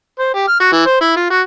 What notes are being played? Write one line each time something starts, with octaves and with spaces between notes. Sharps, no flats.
C5
G4
F6
F#4
E3
C5
E4
F4
F#4